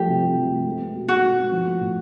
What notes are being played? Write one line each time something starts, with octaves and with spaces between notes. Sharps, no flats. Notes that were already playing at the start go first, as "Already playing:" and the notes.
Already playing: F3 G3 A3 G4
C3
C4
F3
A3
G#3
B3
B2
D#4 F#4
G#3
B3
F3
A3
A2